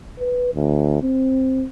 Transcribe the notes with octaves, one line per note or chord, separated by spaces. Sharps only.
B4
D2
C4